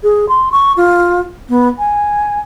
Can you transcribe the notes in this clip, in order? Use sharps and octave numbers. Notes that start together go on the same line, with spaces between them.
G#4
C6
C#6
F4
B3
G#5